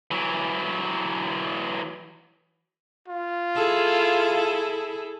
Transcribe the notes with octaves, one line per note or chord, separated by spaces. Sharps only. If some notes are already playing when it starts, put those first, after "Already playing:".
E3 F#3
F4
E4 G#4 A4